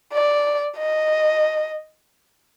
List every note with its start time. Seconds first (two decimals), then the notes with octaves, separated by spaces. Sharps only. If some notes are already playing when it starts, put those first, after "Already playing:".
0.13 D5
0.78 D#5